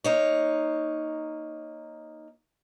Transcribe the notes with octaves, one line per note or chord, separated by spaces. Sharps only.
A#3 D#4 C#5